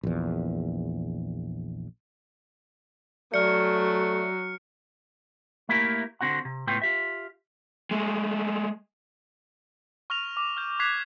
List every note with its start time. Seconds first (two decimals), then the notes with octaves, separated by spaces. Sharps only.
0.03 A#1 E2
3.34 F#3 A3 D5 F6 C#7
5.69 A3 A#3 E4 G4 A#4
6.21 D3 C4 F#4 F#5
6.45 C3
6.67 C#2 A2 B3 E4 F4 G5
6.82 F4 G4 E5
7.91 G#3 A3
10.10 C#6 F6 A#6 F7
10.37 D6
10.57 F6 G6
10.80 D6 F#6 G#6 B6 C7 F7